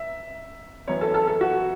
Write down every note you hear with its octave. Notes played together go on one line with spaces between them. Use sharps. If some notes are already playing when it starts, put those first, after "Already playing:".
Already playing: E5
F#2 E3 B3 C#5
A4
A4
A4
F#4